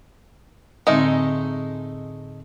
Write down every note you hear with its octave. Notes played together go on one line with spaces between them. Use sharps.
A2 D3 G#3 A3 C4 D#4